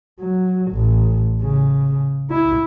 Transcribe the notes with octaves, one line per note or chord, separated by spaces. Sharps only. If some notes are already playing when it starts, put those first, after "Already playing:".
F#3
A1
C#3
E4